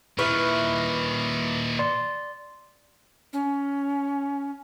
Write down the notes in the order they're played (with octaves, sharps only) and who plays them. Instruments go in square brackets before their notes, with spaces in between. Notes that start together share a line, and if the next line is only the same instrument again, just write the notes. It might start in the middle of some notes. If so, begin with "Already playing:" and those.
[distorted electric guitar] A#2 D#3 [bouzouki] E4 B4 [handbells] C#6 F6
[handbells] D5 C6
[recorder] C#4